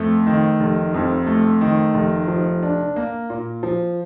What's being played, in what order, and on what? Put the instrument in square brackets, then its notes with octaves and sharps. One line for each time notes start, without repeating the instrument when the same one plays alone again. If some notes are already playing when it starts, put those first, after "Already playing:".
Already playing: [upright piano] F2 A3
D#3
F1
F2
A3
D#3
F1
F3
D4
A#3
A#2
F3